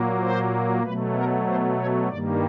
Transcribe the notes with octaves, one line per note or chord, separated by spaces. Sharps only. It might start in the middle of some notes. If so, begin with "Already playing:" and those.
Already playing: A#2 F#3 A#3
C5
B2 F#3 A3 B4
A#4
C5
C#5
G2 D#3 G3 A#3 D5